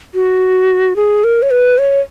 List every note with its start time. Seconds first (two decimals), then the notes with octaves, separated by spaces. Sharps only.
0.14 F#4
0.96 G#4
1.24 A#4
1.42 C#5
1.51 B4
1.78 C#5